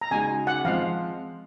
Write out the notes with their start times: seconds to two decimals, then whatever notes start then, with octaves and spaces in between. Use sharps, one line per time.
0.02 A#5
0.11 C#3 G#3 D#4 F#4 G#5
0.47 F#5
0.65 F3 G#3 C4 F5